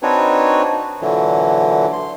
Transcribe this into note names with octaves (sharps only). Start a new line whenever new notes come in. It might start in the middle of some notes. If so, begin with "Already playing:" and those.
C4 D4 D#4 F#4 B4 C#5
A#2 D3 E3 F#3
C6